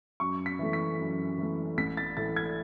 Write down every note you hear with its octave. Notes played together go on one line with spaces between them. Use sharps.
F#2 C#6
B6
E3 A3
B6
F#2
E3 A3
A1 B6
A6
A2 E3 A3 A6
G#6